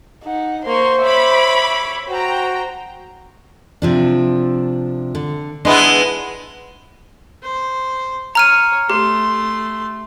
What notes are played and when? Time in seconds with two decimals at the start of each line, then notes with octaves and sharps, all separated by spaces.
0.24 D#4 F#5
0.65 A#3 C5 C6 C#6
1.02 C#5 E5 B5 D6
2.09 F#4 C5 G5 A#5
3.82 C3 F3 D4
5.15 D3
5.65 G#3 B3 D4 E4
7.43 C5
8.35 C#5 A#5 F6 D#7
8.90 A3 G4 C6